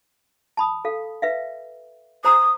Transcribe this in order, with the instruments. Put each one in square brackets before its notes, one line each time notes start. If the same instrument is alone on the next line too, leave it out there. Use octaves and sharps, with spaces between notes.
[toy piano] A5 B5 D#6
A4 F5
B4 E5 F5
[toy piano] C5 A#5 E6 [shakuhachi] D#6